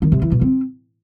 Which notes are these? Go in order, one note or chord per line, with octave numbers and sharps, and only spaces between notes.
D#3
C3
E3
B2
C4